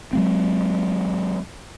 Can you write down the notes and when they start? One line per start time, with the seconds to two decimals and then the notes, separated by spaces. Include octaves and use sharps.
0.13 F#3 G#3 C4